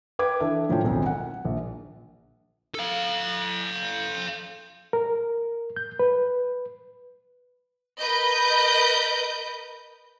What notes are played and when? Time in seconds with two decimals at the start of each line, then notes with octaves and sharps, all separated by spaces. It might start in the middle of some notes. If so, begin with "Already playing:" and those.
0.19 B4 G5 D6 G#6
0.40 E3 D4 A4 E5
0.69 A2 F3 F#3 C#4 G5
0.83 E1 B1 D#3 C4
1.06 F#5
1.45 A#1
2.75 A4 F5
4.93 A#4
5.76 G6
5.99 B4
7.99 A#4 B4 D#5 G6